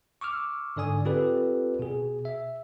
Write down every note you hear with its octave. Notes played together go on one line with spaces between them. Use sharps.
C#6 D6 E6 F6
G#2 D3 D5 G#5 D#6
C4 F4 G4 A4 B4 D5
B2 G#4
E5